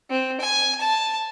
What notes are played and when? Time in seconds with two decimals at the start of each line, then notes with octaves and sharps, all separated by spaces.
0.10 C4
0.40 G#5
0.80 A5